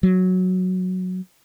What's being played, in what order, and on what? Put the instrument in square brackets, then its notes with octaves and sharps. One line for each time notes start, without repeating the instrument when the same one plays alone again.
[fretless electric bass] F#3